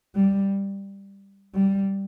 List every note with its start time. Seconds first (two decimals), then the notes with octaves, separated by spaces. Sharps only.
0.16 G3
1.55 G3